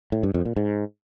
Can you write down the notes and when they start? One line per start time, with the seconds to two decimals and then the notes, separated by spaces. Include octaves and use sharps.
0.12 A2
0.23 G2
0.34 F2
0.45 A#2
0.56 G#2